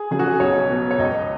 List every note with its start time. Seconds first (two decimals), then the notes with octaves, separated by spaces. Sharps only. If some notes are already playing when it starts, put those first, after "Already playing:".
Already playing: G#4
0.11 C#3 F#3 G#4
0.19 F#4
0.28 G#4
0.40 B1 C#5
0.69 B2 F#3 B3
0.91 C#5
0.98 C#2 D#5